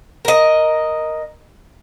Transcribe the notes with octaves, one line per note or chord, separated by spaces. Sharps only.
A#4 D#5